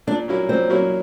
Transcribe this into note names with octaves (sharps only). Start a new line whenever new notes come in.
A#2 D4
F#3 A#3 C#4 E4
A#2 C4
F#3 A#3 C#4 E4